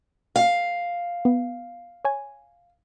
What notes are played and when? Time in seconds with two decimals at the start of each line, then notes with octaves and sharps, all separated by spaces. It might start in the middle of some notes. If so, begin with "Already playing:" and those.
0.36 F5
1.25 B3
2.05 C#5 G#5